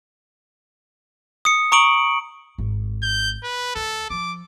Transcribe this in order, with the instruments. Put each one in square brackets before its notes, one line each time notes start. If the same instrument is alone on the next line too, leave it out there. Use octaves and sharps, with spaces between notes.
[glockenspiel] D#6 C#7
A#5 C#6 D#6 D7 F#7
[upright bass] G#1
[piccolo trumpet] G6
B4
[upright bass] D2 [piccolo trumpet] A4
[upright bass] F3 [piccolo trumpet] D6